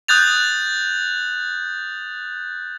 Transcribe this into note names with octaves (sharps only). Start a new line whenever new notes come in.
D#6 F#6 G6 A6 F7